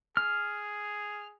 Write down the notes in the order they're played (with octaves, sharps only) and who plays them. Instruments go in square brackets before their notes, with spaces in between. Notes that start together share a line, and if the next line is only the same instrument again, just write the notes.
[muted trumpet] G#4 [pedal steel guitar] F6